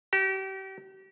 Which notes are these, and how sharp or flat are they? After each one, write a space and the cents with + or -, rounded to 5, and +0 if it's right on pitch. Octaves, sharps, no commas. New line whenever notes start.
G4 -35